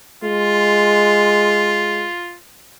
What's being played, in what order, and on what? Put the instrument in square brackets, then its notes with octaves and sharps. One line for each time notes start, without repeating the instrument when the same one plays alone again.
[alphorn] G#3 [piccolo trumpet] F4